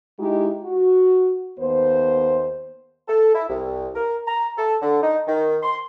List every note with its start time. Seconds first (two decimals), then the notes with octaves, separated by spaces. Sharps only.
0.19 G#3 D#4 E4 G4
0.62 F#4
1.59 D#2 B3 C5
3.08 A4
3.34 E4
3.49 C2
3.95 A#4
4.27 A#5
4.58 A4
4.82 D3
5.02 D#4
5.28 D#3
5.63 C6